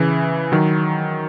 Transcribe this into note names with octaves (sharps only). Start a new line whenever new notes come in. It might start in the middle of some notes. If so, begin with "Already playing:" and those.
Already playing: C#3 E3
D#3 F#3